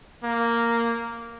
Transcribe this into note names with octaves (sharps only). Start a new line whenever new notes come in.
A#3